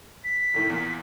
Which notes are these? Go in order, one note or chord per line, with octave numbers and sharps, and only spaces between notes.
B6
F1 A2 D#3
E2 A#2